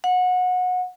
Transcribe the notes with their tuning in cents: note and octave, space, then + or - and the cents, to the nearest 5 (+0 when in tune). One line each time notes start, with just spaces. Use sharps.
F#5 -25